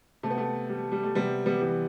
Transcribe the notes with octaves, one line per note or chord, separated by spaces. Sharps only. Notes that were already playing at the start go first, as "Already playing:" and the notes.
C3 A3
B3
A3
G3
G3
A3
C3 G3 B3
G3 B3
E3 G3